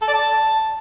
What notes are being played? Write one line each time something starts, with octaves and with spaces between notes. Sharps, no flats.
A4
D5
A5